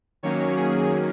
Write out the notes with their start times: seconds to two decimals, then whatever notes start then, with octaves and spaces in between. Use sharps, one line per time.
0.23 D#3 F#3 A#3 C#4 C#5
0.56 G#4